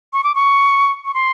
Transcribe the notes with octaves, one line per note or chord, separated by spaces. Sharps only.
C#6
D6
C#6
C#6
C6